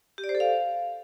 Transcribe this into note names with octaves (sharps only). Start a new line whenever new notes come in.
G4
D5
C5
A4
F5